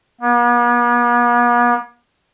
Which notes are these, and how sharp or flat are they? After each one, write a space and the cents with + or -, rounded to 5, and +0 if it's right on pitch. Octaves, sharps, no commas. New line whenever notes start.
B3 -45